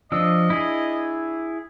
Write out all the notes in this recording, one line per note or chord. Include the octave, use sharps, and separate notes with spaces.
F3 D4 D#5 E6
E4 G#4